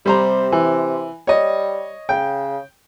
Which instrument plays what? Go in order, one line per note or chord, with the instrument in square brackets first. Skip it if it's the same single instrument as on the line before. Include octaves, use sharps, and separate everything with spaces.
[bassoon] C3 [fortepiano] G3 C5 A#5
[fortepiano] E3
[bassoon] G3 [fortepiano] C#5 D#5
[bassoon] C#3 [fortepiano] G5